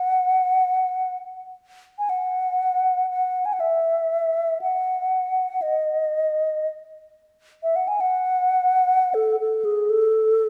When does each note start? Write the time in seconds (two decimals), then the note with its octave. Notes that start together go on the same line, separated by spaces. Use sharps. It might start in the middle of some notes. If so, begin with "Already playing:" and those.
Already playing: F#5
1.99 G#5
2.09 F#5
3.10 F#5
3.45 G#5
3.53 F#5
3.60 E5
4.61 F#5
5.62 D#5
7.63 E5
7.76 F#5
7.88 G#5
8.00 F#5
9.14 A4
9.40 A4
9.65 G#4
9.90 A4